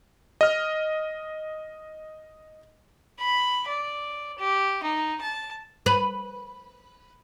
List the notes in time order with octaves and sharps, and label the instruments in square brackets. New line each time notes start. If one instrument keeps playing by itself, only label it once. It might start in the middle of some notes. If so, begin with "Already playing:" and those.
[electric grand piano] D#5 F6
[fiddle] B5
D5
G4
D#4
A5
[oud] B4